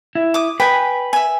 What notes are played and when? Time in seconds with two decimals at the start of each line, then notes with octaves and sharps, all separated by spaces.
0.15 E4
0.34 D6 D#6
0.60 B4 G5 G#5
1.13 E5 G#5